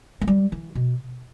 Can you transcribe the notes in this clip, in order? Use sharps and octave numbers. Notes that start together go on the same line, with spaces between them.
A3
G3
E3
B2